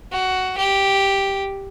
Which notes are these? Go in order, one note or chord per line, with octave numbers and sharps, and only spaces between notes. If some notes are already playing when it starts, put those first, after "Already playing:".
F#4
G4